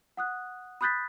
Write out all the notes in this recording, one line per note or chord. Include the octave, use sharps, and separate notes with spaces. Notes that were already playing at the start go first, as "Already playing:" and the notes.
F#5 D#6 F#6
B5 D#6 F#6 G6 A6 B6